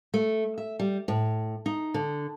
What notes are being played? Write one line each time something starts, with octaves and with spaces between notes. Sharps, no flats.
A3
E5
G3
A2
D#4
D3